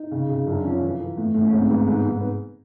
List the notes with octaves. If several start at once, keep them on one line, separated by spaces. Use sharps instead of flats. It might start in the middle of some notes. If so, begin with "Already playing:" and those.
Already playing: D#4
C#3
C#3
F#2 D4
F3 C#4
E3
E3
A2
A2
C#4
G#2 C4
G#2 B3
G#2
G#2
B3